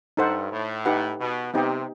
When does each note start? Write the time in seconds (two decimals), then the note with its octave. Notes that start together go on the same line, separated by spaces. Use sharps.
0.17 G2 D#4 A4 C5 F#5
0.52 A2
0.86 D#4 G4 B4 F#5
1.20 B2
1.53 C3 B3 D#4 G4 D#5 G5